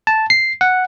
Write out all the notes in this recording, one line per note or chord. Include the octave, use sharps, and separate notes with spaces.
A5
C7
F#5